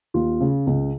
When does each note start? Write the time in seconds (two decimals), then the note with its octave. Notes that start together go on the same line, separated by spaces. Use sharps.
0.14 D#2 F4
0.41 C#3
0.67 C#2